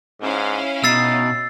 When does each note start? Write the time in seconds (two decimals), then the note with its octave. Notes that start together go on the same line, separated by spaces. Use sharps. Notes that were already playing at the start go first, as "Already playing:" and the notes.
0.22 G#2 C#4 E4 F5
0.84 B2 D#4 E6 A6 C7